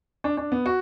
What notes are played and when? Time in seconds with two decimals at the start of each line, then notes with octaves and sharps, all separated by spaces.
0.24 D4
0.37 D4
0.52 B3
0.66 F#4